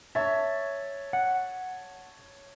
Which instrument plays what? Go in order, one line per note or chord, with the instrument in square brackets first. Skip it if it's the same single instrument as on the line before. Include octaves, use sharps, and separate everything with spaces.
[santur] C#5 A5 [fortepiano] E5
[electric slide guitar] F#5